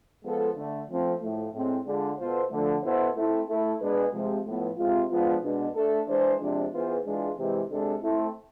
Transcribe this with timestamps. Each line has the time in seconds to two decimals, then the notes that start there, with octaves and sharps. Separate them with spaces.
0.24 F3 G#3 B3 F4 A4
0.56 D3 A3 D4
0.88 F3 A3 C4
1.21 A2 F3 A3
1.54 A2 G#3 C4
1.86 D3 G#3 D4 F4 G#4
2.18 B2 B3 F4 A4 C5
2.51 D3 F3 A3
2.83 B2 B3 E4 A4 C5
3.16 A3 C4 E4
3.47 A3 E4 A4
3.80 B2 G#3 D4 G#4 B4
4.13 C3 F3 G#3
4.45 A2 F3 B3
4.77 C3 G#3 C4 F4
5.10 F3 G#3 B3 D4 F4
5.43 B2 G#3 D4
5.75 A3 D4 A4
6.08 E3 G#3 D4 G#4 C5
6.40 C3 F3 G#3 D4
6.72 E3 B3 F4 G#4 C5
7.05 E3 G#3 D4 F4 G#4
7.37 C3 E3 G#3
7.70 C3 G#3 D4 A4
8.02 A3 C4 E4